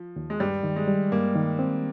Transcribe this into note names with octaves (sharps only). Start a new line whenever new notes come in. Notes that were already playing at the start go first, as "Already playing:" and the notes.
Already playing: F3
D#2
G#3
G2 G3
D#3
G#3
G3
G2 A#3
D#3
C4